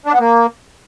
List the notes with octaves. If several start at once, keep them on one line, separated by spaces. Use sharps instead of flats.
D4
B3
A#3